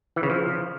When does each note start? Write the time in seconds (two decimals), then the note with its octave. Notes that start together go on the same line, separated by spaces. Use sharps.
0.16 E3
0.23 C#3
0.30 F3